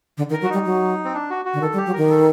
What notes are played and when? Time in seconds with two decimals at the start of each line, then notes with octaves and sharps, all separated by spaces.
0.17 D3
0.30 D#3
0.33 A#4
0.41 F#3
0.44 F#4
0.49 G3 D#4
0.65 F#3
1.05 C4
1.14 D4
1.30 F#4
1.45 F#4
1.54 D3
1.61 D#3 A4
1.73 G3
1.78 G4
1.86 F#3
1.93 D#3 A#4
2.10 A4